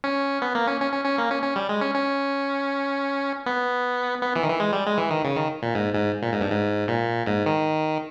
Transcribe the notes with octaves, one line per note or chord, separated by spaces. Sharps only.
C#4
B3
A#3
C#4
C#4
C#4
C#4
A#3
C#4
C#4
G3
G#3
C#4
C#4
B3
B3
E3
D#3
E3
G#3
G3
G#3
E3
D#3
C#3
D#3
A#2
G#2
G#2
A#2
G#2
G2
G#2
A#2
G#2
D#3